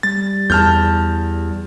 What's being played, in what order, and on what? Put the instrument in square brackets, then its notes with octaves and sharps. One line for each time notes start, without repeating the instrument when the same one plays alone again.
[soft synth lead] G3 [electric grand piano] A6
[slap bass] E2 [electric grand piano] A5 F6 G6